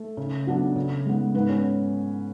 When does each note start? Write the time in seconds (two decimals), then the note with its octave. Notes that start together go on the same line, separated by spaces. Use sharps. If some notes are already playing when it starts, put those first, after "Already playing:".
Already playing: A3 A4
0.17 C#3
0.47 F#3 B3 D4
0.76 C#3
1.06 G#3 B3
1.34 G#2 B3 B4
1.49 C#4 C#5